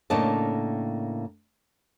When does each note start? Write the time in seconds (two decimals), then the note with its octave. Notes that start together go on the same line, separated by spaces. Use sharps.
0.10 A2 C#3 A#3 D4 D#5 A5